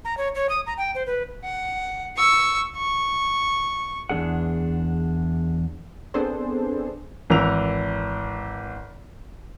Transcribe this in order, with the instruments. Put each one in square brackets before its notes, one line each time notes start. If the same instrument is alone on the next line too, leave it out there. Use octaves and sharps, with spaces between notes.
[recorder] A#5
C#5
C#5
D#6
A#5
G5
C5
B4
[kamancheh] F#5
C#6 E6
C#6
[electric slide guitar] E2 A#3 D4 G#4 F#5
[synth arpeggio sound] B3 C4 D4 G#4 A4 C5
[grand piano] G#1 E3 A#4 E6 F7